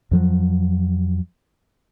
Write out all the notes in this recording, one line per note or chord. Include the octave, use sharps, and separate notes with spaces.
F2 F3 F#3